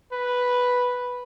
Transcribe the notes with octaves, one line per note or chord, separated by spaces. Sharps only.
B4